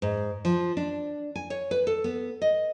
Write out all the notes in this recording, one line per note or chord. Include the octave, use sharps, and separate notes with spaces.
G#2
F3
D4
G#5
C#5
B4
A4
B3
D#5